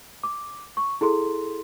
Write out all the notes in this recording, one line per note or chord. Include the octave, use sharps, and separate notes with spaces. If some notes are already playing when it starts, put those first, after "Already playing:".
D6
C#6
E4 G#4 A4 C6